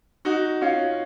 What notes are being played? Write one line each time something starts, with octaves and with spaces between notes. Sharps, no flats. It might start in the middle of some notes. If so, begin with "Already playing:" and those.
D#4 F#4
C#4 F4